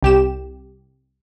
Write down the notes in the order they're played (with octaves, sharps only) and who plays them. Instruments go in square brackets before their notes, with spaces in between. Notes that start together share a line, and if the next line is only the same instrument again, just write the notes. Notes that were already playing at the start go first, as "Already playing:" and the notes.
[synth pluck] C2 G4 E7